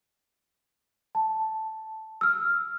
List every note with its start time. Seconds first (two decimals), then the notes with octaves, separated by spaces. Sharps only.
1.15 A5
2.21 E6 F6